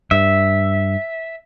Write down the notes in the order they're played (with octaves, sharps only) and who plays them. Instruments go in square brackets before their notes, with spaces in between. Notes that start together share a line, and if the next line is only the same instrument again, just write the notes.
[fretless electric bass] G2 [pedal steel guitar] E5